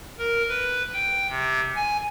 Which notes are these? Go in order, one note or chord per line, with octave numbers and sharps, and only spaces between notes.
A#4
B4
G5
C3
G#5